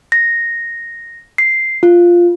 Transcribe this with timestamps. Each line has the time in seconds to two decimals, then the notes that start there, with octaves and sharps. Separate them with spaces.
0.12 A#6
1.38 C7
1.83 F4